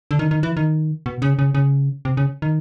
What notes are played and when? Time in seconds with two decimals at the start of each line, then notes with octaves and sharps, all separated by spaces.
0.11 D3
0.19 D#3
0.31 D#3
0.43 E3
0.57 D#3
1.06 B2
1.22 C#3
1.39 C#3
1.55 C#3
2.05 C3
2.17 C#3
2.42 D#3